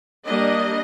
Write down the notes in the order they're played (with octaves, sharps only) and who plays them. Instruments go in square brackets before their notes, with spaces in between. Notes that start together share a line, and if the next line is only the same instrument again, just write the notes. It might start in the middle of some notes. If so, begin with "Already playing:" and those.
[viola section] G3 A#3 D4 D#5